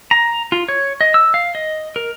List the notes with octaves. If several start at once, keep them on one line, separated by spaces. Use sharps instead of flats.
A#5
F4
C#5
D#5
E6
F5
D#5
A#4